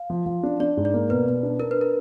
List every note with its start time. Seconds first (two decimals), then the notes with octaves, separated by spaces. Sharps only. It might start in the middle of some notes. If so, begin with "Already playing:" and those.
Already playing: F5
0.10 F3
0.26 F3
0.43 D4
0.60 D4 D5
0.77 G#2
0.85 D5
0.94 A#3
1.10 B2 B4
1.27 B2
1.43 D4
1.59 D4 A#4
1.71 B4
1.81 A#4